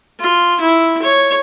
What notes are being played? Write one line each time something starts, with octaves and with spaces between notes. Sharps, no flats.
F4
E4
C#5